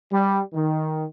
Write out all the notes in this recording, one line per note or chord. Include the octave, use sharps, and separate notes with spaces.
G3
D#3